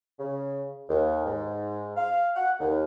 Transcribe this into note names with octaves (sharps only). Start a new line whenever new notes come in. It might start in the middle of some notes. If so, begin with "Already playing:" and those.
C#3
D#2
G#2
F5
F#5
D#2